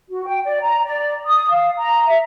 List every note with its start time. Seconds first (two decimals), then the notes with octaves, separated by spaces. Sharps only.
0.09 F#4
0.25 G5
0.45 D5
0.61 A#5
0.84 D5
1.26 D#6
1.50 F5
1.77 A#5
2.07 E5